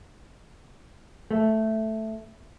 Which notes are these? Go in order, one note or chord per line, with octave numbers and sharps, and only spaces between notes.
A3